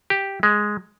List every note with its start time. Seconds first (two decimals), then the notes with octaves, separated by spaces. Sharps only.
0.10 G4
0.43 G#3